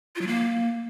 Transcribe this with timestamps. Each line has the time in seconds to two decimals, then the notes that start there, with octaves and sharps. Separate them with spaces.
0.16 F4
0.21 F#3
0.27 A#3